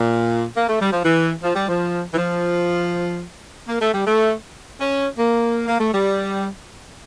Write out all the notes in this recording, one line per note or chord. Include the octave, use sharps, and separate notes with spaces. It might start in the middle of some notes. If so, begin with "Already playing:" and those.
Already playing: A#2
A#3
A3
G3
F3
E3
F3
G3
F3
E3
F3
A#3
A3
G3
A3
C#4
A#3
A#3
A3
G3